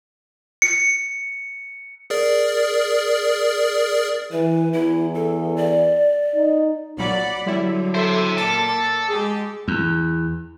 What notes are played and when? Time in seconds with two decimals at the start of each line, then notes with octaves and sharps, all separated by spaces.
0.62 C#7
2.10 G#4 A#4 D5
4.32 E3 B4
4.73 E2 E4
5.15 A4
5.56 D5
6.36 D#4
6.97 B1 A#2 F#3 D5 F#5 B5
7.46 D3 F#3 G3 E4
7.95 E4 A4 C5 E5
8.37 A#2 A4 D6 A6
9.09 G#3 G4 G#4 A5
9.68 E2